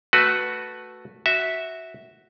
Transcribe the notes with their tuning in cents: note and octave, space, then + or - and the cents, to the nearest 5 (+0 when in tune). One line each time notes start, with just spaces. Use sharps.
A3 +0 F#4 +0 B4 +0
F#4 +0 E5 -10